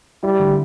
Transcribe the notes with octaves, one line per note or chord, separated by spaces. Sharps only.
G3 E4
D3